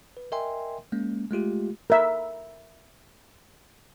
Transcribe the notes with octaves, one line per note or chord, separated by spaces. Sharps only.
B4
A#4 D#5 E5 G5 G#5 C6
G#3 A#3 C#4
G#3 A3 F4 G4
A#4 E5